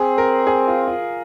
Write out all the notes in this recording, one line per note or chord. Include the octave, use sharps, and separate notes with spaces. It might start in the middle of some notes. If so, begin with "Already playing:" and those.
Already playing: C4 G#4
A#4
G#4
F4
F4